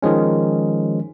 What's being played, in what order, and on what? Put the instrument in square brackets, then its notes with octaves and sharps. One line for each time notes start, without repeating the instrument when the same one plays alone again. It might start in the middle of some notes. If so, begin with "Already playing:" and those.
[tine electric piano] D#3 F3 G#3 C#4